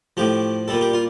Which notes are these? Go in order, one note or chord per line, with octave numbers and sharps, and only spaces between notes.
A2 F3 G4
A#2 G3 A4
G4
F4